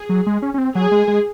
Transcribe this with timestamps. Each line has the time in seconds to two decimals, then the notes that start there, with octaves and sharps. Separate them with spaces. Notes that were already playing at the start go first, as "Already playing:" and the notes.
Already playing: G#4
0.09 F#3
0.27 G#3
0.42 C#4
0.54 C#4
0.58 C4
0.75 F#3 G#4
0.91 G#3
1.08 G#3